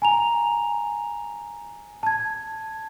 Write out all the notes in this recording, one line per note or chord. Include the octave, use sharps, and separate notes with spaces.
G#5 A#5 F7
A5 G#6